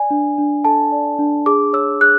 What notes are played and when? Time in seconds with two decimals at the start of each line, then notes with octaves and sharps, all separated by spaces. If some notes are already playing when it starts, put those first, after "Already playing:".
Already playing: D5 G#5
0.11 D4
0.38 D4
0.65 A4 A5
0.92 D5
1.19 D4
1.46 G#4 D6
1.73 C#5 E6
2.01 G#4 F#6